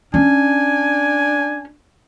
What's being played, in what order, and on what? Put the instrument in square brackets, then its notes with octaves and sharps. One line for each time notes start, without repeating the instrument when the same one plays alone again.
[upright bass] C#4 [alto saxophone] D4 [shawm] G#5